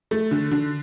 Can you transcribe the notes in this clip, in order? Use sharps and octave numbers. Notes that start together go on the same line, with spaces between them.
A3
D3
D3